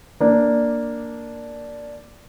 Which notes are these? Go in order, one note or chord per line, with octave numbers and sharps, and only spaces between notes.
A#3 D4